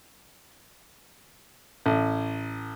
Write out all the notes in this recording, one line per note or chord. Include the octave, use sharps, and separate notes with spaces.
A1